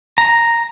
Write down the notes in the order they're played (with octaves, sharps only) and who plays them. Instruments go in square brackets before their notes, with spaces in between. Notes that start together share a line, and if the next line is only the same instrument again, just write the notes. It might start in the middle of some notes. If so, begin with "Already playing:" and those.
[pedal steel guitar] A#5